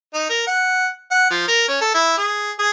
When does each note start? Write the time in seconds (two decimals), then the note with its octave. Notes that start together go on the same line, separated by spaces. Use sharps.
0.14 D#4
0.29 A#4
0.47 F#5
1.11 F#5
1.30 F3
1.48 A#4
1.68 C#4
1.81 A4
1.95 E4
2.18 G#4
2.59 G#4